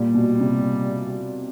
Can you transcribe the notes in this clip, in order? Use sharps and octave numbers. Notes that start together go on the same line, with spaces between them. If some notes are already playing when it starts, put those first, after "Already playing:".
Already playing: A#2 G3
B2
C3